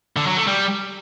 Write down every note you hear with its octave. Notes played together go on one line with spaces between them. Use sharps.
D3
F#3
A3
G3